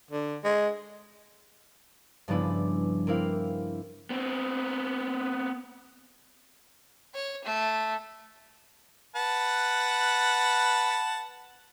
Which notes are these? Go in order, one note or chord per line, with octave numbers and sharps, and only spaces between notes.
D3
G#3
G2 C#3 F3 B3 D4 E4
A#3 C4 E4 F5
B3 C4
C#5
A3
B4 F#5 A5